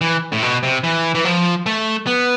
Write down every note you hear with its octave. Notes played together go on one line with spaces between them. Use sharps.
E3
A2
B2
C3
E3
E3
F3
A3
B3